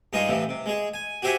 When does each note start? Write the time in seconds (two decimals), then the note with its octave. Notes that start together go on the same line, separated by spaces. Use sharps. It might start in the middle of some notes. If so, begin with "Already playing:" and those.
0.13 G2 G#3 D#4 F4 G#4 D#5
0.29 A2 C3 E3 F3
0.49 C3
0.66 G#3 G#4
0.94 G#5
1.22 F#4 G4 C5 E5 F#5 G#5